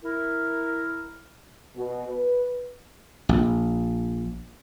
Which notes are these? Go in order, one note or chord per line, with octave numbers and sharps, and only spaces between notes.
E4 A#4
B2
B4
A#1